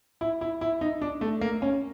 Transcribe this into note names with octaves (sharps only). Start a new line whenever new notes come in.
E4
E4
E4
D#4
D4
A3
A#3
C#4